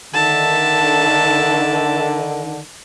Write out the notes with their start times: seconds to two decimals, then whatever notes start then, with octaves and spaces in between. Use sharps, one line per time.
0.14 D3 D#3 E5 A5